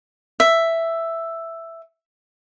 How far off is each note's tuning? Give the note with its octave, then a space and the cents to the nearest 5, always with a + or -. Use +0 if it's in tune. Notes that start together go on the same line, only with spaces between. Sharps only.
E5 +5